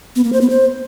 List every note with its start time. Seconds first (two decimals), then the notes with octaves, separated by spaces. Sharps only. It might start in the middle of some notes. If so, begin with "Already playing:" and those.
0.16 B3
0.24 A#3
0.33 C5
0.41 B3
0.50 C5